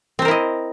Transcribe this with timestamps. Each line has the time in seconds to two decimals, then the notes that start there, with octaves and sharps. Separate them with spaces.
0.19 C4
0.22 C5
0.25 A#4
0.28 E4
0.31 D#5